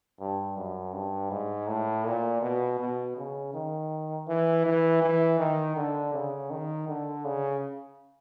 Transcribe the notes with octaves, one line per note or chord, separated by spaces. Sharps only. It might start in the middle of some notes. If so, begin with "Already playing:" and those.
G2
F#2
G2
G#2
A2
A#2
B2
B2
C#3
D#3
E3
E3
E3
D#3
D3
C#3
D#3
D3
C#3